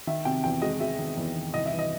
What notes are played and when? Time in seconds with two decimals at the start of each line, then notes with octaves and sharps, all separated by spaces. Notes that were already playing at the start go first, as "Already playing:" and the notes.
0.07 D#3 E5
0.25 C3 G5
0.44 E2 G5
0.62 G#3 D#5
0.80 G#3 E5
0.99 D#3
1.17 E2
1.35 D#3
1.54 C2 D#5
1.66 E5
1.72 E3
1.79 D#5